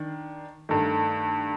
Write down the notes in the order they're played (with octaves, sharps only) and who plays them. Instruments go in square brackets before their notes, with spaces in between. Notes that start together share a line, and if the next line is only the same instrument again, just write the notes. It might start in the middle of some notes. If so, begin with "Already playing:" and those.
Already playing: [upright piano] D#3 D4
G2 D#3 A3